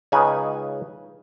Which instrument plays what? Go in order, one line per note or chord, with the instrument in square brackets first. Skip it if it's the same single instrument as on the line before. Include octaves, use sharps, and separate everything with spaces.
[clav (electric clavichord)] C#2 C#3 D#4 B4 G#5